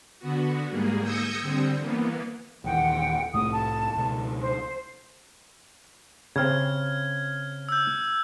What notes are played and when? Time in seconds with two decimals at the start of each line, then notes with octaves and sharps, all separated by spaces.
0.19 D3 B3 F#4
0.71 G#2 G3 A#3 G#4
1.02 D#6 E6 G6 G#6 A#6 C#7
1.41 D3 G3 C4
1.78 E3 A#3 B3
2.64 D#1 D#2 E3 F#5 G5
3.33 C2 A2 A3 D#6
3.51 A5
3.95 C#2 B2
4.41 C5
6.36 C#3 C4 F6 G#6
7.69 E6 G6